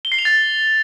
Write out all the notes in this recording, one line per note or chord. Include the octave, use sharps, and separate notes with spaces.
G7
C7
F7
A6